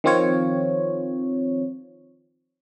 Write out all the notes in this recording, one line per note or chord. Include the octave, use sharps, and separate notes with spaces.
D#3 F3 C4 F4 C#5